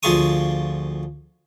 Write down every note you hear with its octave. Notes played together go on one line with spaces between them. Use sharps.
D2 F3 F4 G#4 C#6 D#6